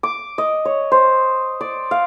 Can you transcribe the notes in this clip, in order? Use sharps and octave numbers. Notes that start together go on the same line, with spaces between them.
D6
D#5
C#5
C5
D5
F5